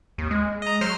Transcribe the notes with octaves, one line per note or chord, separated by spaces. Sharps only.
D#2
G#3
D#5 A#5
F#3 C5 F6